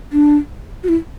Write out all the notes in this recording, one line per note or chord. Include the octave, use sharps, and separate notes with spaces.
D4
F#4
E4